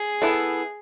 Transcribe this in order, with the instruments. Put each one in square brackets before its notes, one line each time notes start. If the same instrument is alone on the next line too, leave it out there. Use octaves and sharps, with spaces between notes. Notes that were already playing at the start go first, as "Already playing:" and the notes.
Already playing: [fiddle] G#4
[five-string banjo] B3 E4 A4